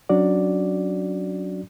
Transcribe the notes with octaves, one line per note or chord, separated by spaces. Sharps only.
F#3 C#4 D4 F#4 D5